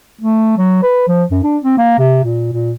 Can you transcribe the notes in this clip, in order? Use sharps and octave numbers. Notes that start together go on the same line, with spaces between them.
A3
F#3
B4
F3
F#2
D4
C4
A#3
C3
A#2
A#2